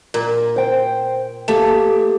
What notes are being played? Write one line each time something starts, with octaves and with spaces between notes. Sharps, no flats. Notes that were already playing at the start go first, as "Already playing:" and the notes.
A#2
C5 G5
A3 A#3 G4